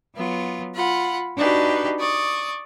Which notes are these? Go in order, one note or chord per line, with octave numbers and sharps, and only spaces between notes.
F#3 B3 F4
F4 F#5 B5
D4 D#4 F#4 G4 B4
D5 C#6 D#6